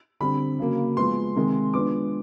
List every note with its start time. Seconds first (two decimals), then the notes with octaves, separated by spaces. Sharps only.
0.20 D3 G3 C4 B5
0.59 C#3 F#3 A#3
0.97 F3 G#3 B3 C6
1.36 C3 D#3 G#3
1.74 F3 G#3 B3 D4 D6